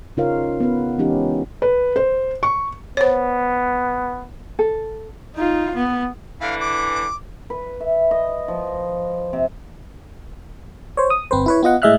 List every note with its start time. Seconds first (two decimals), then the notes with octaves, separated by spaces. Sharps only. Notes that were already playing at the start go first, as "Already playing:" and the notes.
0.17 C#3 D#4 F4 A#4 C#5 F5
0.60 B3 B4
0.98 E3 G#3 C#4 D#4 G4
1.62 B4
1.96 C5
2.43 C#6
2.97 B3 C5 C#5
4.59 A4
5.36 D#4 F4
5.75 B3
6.41 D3 E3 F5
6.60 D6
7.50 B4
7.80 E5
8.11 D#5
8.48 F3
9.33 C3
10.97 C5 C#5
11.10 D#6
11.31 G1 C4 B4 C5
11.46 E4 B4 C#5
11.63 B3 F4 D#5 F#5
11.82 A2 G#3 D#5 E5 F6 F#6